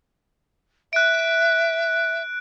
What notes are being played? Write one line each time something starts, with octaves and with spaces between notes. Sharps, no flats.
E5 F#6 D7